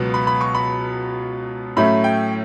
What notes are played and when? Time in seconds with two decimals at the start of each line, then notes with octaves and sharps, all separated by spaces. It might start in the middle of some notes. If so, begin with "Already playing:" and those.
Already playing: C#2 B2 F#3 B3
0.14 B5
0.27 B5
0.41 C#6
0.55 B5
1.77 A2 F#3 A3 C#4 E4 B5
2.04 G5